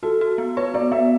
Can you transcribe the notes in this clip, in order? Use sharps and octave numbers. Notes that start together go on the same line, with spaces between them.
F#4 A4
F#4
B3
B4 C#5
B3 D5
B3 E5